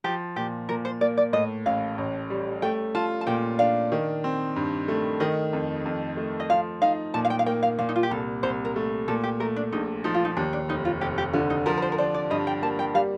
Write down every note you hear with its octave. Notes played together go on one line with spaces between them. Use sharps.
F3 G4
A#2 G4
A#2 A#4
C5
A#3 D5
D5
A2 D#5
A1 F5
A1
G3
A3 G5
F4 A5
A5
A#2 G5
D4 F5
D#3
C4
G2
A3
D#3 D#5
F2
F2
A3
D#5
F3 F5
D#4 F5
A#2 A5
F5
G5
F5
A#3 G5
F5
A#2 F5
D#4
F4
G4
C2 A4
C2 C5
A#4
A3
A#2 A4
G4
A3 A#4
D4
A#1 D#4
F3 D#4
F4
D#4
D#2 D4
D4
F1 D#4
F4
F1 G4
G4
D3 F4
D#4
F3 A#4
A#4
C5
A#4
D4 C5
D5
G2 D#5
G5
A#3 A5
G5
G3 F5